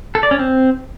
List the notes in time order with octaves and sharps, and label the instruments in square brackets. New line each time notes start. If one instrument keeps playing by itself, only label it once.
[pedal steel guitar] A4
D5
C#4
C4